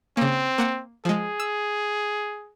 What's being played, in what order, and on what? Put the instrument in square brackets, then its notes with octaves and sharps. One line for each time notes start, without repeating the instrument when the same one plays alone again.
[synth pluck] C#3 A#3 [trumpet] C4
[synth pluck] A#3 F#5 C#7
[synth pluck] F3 G#3 [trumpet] G#4
[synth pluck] E6